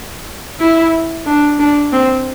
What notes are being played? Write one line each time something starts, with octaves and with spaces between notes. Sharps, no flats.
E4
D4
D4
C4